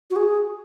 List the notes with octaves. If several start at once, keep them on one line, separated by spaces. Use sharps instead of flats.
F#4
G#4